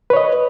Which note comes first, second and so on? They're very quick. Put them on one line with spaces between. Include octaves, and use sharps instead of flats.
B4 C#5 D#5